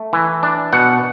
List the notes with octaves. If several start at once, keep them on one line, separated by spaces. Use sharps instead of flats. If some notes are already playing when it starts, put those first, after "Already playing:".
Already playing: A3
E3
D4
B2 F#5